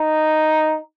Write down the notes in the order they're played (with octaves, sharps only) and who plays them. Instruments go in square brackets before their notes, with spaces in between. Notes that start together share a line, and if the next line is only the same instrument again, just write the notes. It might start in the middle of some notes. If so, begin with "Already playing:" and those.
Already playing: [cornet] D#4